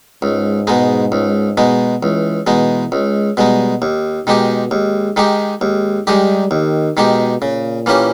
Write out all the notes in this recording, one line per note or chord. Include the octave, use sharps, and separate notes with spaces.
C#2 G#2
B2 G#3 D#4
C#2
B2 G#3 D#4
C#2 E3
B2 E3 G#3 D#4
C#2 G#3
B2 G3 G#3 D#4
D#2
B2 D#3 G#3 D#4 G4
D#2 G#3
D#3 G#3 D#4 G4
D#2 G#3
D#3 G3 G#3 D#4 G4
D#2 D#3
B2 D#3 G#3 D#4 G4
A#2 C#3
E3 A#3 C#4 G4